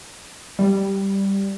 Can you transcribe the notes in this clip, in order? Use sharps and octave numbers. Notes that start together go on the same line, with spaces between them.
G3